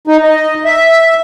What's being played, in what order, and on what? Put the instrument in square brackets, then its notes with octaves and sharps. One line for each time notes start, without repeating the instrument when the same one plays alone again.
[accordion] D#4
D#5
E5